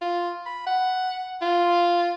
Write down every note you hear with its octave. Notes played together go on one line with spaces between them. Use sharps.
F4
B5
F#5
F4